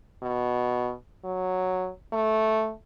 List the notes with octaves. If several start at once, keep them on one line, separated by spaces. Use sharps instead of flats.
B2
F#3
A3